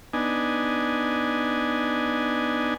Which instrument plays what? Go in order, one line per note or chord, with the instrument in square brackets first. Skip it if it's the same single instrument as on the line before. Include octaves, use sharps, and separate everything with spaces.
[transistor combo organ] B3 D4 D#4 G#5